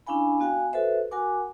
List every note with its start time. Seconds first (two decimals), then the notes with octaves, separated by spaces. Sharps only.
0.07 C#4 D4 E4 F5 G#5 B5
0.40 B3 F#4 F5 G5 G#5
0.73 F#4 A4 B4 C5 E5
1.11 F#4 A#4 F#5 G#5 D6